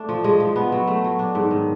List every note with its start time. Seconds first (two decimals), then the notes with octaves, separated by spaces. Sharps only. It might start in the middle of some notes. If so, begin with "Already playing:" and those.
Already playing: A3 D4
0.09 F3
0.24 G#3
0.40 F3
0.56 B3
0.72 F#3
0.87 A3
1.04 F#3
1.19 D4
1.35 G#2
1.51 D#3